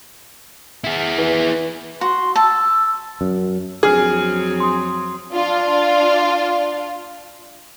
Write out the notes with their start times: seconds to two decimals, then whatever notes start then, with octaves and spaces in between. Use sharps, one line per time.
0.84 E4 G#4
1.18 E3
2.01 F#4 C6
2.36 A5 E6
3.21 F#2
3.83 F2 F#3 C4 D4 G#4 F6
4.60 C6 D#6
5.33 D4 F4